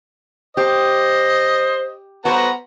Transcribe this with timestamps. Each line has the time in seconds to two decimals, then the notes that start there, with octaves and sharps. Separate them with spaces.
0.57 G4 C5 D#5
2.25 B3 F#4 B4 C5 A#5